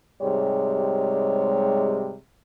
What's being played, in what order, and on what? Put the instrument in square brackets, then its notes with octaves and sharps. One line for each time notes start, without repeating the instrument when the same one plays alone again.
[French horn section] G#2 C3 G3 G#3 C#5